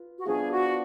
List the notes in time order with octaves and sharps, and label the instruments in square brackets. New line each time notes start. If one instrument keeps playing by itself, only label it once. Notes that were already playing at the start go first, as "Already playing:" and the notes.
Already playing: [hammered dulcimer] F4 B4
[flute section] F#4
[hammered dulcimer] F3 B3 D4 F4 [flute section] G#4
[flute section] F#4